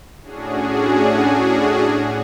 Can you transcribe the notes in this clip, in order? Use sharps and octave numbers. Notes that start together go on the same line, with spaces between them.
A2 C#4 D4 F#4 G#4